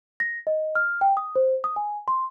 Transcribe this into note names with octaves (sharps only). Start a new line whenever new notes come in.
A#6
D#5
F6
G5
D#6
C5
D#6
G#5
C6